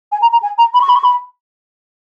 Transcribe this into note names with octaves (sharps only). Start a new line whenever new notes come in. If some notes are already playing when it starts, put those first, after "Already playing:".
G#5
A#5
A#5
G#5
A#5
B5
C#6
B5
C#6
B5